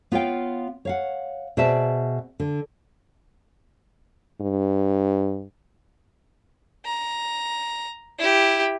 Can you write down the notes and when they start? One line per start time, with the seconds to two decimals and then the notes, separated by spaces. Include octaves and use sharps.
0.12 B3 F4 C#5 F5 G5
0.85 C#5 F5 F#5
1.57 B2 G#4 C5 D5 E5 A5
2.40 D3
4.41 G2
6.85 A#5
8.19 E4 G4